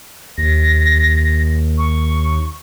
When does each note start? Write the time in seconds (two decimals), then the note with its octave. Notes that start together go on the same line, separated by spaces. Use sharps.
0.38 D#2 A#6
1.78 C#6